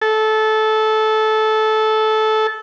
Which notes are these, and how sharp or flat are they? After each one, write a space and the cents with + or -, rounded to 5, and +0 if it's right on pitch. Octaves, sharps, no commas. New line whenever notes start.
A4 -20